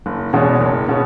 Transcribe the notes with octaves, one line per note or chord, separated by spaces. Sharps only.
F#1
E2 B2 G#3 C#4
F#1
B2 G#3 C#4